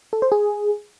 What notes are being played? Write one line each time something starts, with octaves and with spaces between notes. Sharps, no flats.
A4
C5
G#4